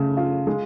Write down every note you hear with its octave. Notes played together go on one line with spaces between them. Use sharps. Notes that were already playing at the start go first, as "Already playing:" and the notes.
Already playing: C#3 A3
F4
G#3